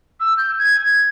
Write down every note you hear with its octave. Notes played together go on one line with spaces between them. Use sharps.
E6
G6
G#6